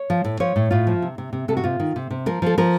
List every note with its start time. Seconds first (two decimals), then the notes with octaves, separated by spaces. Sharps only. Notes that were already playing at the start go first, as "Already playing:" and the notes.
Already playing: C#5
0.10 F3
0.24 A2
0.40 F3 C#5
0.56 A2
0.71 A2 F4
0.87 F3
1.02 C3
1.18 C3
1.33 C3
1.48 C3 A4
1.57 F#4
1.64 C3 F4
1.80 D#3
1.96 C3
2.10 C3
2.26 F3 A#4
2.42 F3 A4
2.58 F3 A#4